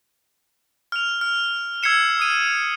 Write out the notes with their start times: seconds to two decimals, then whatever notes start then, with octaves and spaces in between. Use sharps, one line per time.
0.92 F6 F7
1.21 F6
1.83 E6 G#6 C7 C#7 E7
2.20 D#6 D#7